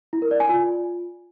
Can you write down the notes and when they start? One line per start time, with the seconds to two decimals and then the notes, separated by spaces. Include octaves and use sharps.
0.13 E4
0.22 A#4
0.31 D5
0.40 G#5
0.49 F4